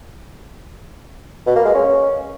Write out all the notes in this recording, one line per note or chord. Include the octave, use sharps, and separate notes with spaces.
B2
A#3
G#3
C#4